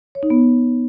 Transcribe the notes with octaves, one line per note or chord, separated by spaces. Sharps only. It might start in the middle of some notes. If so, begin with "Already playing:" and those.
C#5
D#4
B3